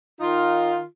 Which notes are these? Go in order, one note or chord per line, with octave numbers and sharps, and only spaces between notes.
D#3 D#4 F4